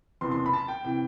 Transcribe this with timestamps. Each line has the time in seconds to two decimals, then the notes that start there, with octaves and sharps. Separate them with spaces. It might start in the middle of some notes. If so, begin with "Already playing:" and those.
0.21 F#1 E2 C3 E3 C6
0.31 C6
0.46 B5
0.53 A5
0.68 G5
0.85 C3 E3 G5